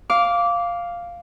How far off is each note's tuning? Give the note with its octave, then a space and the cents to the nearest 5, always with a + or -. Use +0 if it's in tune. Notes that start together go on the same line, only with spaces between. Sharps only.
F5 +0 D6 -15